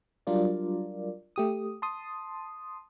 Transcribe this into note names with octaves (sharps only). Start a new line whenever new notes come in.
F#3 G3 D4 F4 A#4 D5
A3 G4 D#6
A5 C6 D#6